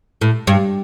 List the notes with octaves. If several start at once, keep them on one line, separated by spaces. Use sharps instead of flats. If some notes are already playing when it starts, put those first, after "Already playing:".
A2
G2